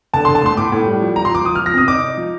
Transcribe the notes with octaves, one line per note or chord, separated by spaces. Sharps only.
D3 A5
C6
D3
A5
A3 C6
A2 D6
A2
G3
F3
F3 A#5
C6
F3 D6
F3 D#6
F6
F3
A#6
C3 D#6
D#4 D6
D#4
F3